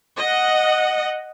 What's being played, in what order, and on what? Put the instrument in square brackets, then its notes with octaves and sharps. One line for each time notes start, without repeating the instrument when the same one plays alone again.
[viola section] D#5 F#5